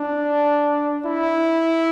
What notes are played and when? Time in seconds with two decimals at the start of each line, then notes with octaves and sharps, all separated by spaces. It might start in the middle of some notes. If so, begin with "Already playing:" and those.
Already playing: D4
1.05 E4